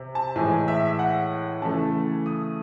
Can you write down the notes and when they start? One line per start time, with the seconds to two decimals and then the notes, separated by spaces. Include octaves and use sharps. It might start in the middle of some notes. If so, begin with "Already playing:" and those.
Already playing: C3
0.15 A5
0.36 A2 E3 G#3 G#5
0.68 E5
0.99 F#5
1.62 C#3 E3 A3 A5
2.26 D#6